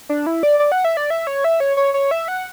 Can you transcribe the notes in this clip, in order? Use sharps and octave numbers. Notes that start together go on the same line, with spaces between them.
D4
E4
D5
D5
F#5
E5
D5
E5
C#5
E5
C#5
C#5
C#5
E5
F#5